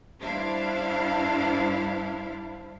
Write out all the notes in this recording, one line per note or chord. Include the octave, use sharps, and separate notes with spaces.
G2 D4 E4 C5 F5